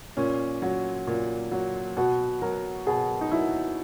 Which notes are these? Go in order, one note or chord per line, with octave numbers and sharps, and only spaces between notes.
A#2 C#4
F#3
A#2
F#3
B2 F#4
F#3 A#4
B2 G#4
D#4
F#3 E4